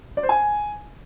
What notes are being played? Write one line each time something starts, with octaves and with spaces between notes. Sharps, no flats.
D5
C5
G#5